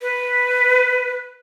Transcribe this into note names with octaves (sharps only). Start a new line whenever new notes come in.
B4